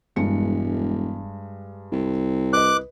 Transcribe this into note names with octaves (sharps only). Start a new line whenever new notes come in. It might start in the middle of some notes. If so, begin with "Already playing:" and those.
E1 G2 G#3 C#7
C2
B4 D#5 D6 F#6